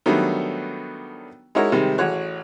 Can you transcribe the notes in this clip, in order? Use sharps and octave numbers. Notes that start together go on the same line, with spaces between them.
D#3 F#3 G3 A3 B3 D4
G#3 D#4 E4 F#4 A#4 C#5
C3 D#3 G3 G#3
A1 F#4 G#4 C#5 F#6